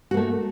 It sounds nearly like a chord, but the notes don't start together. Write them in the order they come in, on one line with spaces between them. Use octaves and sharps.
F#4 A#3 A3